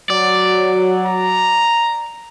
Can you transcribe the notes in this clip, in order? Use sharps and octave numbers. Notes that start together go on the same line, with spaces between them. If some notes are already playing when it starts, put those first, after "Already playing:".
F#3 D5
A#5